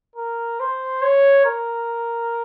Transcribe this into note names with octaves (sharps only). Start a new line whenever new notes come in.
A#4
C5
C#5
A#4